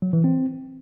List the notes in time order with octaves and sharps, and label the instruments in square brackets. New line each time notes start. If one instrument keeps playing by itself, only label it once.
[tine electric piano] F#3
E3
C4